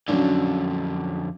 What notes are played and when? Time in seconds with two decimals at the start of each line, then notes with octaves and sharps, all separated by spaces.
0.08 F2 D3 F#3 C#4 D4